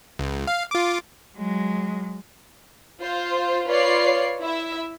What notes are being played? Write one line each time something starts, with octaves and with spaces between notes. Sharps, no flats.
C#2
F5
F4 D6
F#3 G#3
F4 C5
F4 B4 C#5 D5 C7
E4 E5